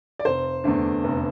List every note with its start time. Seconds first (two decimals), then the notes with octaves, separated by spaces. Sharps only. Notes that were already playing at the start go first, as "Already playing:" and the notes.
0.19 D5
0.25 F1 C5
0.64 E2 D3 A3 D4
1.04 F1